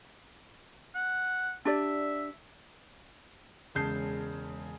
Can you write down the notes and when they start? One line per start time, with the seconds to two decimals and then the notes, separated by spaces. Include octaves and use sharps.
0.95 F#5
1.65 D4 G4 D5 E5
3.75 E1 C#3 G#3 A5 G6 C7